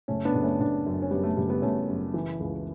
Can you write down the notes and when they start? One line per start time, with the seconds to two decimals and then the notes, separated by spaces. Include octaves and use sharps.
0.08 F#1 A3 C#4
0.25 B3 D4
0.34 F#1
0.43 A3 C#4
0.60 F#1 B3 D4
0.86 F#2
1.02 C#4
1.11 F#2 G3 B3
1.24 A3
1.37 F#1 G3
1.49 G3 B3
1.62 F#1 A3 C#4
1.88 F#2
2.14 E3
2.40 C#2